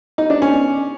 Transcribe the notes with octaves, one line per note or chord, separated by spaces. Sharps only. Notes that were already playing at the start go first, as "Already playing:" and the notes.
D#4
D4
C#4